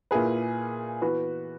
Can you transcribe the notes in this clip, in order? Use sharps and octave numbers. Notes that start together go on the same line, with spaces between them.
A#2 A#3 E4 G#4 B4
E3 B3 F#4 B4